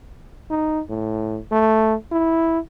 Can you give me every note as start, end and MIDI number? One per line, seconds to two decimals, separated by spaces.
0.50 0.81 63
0.90 1.39 45
1.52 1.95 57
2.12 2.59 64